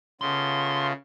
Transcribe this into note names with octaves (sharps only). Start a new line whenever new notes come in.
C#3 A3 B3 F4 C6